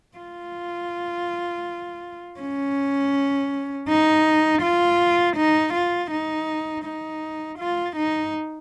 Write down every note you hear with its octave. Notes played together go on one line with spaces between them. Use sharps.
F4
C#4
D#4
F4
D#4
F4
D#4
D#4
F4
D#4